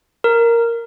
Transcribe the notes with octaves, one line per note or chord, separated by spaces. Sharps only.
A#4